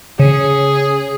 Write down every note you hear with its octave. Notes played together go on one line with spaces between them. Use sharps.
C#3 G#4